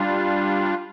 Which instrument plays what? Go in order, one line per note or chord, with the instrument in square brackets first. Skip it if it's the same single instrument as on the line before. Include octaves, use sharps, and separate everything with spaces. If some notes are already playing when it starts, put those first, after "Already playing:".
Already playing: [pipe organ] G3 D4 F4